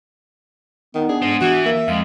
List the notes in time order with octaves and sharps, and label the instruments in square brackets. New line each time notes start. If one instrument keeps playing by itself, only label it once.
[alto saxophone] D#3 [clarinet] B3
[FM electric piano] D4 [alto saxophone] G#4
[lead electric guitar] G#2 C5
[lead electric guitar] E3 [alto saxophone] F#4
[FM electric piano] A#3 [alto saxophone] E5
[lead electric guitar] F2 [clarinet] G#3 [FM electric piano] F5